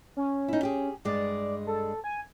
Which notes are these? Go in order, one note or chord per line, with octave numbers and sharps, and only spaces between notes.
C#4
D#4 E4
G4 G#4
G2 G#3 D5
A4
G#5